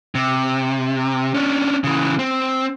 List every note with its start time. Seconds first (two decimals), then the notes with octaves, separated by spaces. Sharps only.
0.15 C3
1.34 C#4 D4
1.84 C#3 E3
2.19 C4